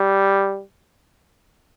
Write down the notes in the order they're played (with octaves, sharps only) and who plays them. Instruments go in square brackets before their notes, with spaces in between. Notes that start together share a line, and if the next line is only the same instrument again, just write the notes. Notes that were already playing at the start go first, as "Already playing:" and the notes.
Already playing: [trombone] G3